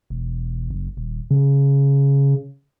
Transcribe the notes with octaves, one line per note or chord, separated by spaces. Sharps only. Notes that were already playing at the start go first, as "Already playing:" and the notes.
E1
F#1
D#1
C#3